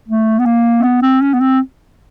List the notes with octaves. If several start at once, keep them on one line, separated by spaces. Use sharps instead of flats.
A3
B3
A#3
C4
B3
C4
C#4
B3
C4